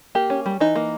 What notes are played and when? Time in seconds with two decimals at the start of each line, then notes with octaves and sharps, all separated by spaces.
0.15 A#3 G4
0.30 C#4
0.46 G3
0.60 E3 D#4
0.76 A#3